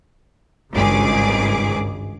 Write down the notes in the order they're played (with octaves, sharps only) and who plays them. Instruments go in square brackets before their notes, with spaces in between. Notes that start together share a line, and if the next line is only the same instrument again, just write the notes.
[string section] G#1 C#2 G2 G#4 D6